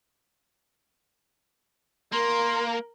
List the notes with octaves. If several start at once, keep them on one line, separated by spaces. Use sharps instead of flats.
A#3 A#4 C6